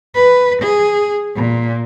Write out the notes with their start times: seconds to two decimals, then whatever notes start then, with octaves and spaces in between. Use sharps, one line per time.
0.15 B4
0.62 G#4
1.36 A#2